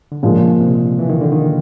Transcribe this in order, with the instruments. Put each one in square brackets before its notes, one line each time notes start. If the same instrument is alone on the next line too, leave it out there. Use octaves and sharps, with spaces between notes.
[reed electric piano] D3
[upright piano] A#2 F3 G#3 [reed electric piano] C#3
[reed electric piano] C3
E3
D#3
D3
D#3